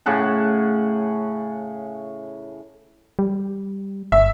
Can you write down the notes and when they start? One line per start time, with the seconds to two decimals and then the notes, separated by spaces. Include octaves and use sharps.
0.06 A2 C#3 F#5 A5
3.19 G3
4.12 G1 E5